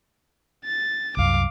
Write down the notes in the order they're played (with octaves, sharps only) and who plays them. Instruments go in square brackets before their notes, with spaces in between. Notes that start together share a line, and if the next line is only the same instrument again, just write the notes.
[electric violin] A6
[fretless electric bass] C2 F#2 [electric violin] F5 D6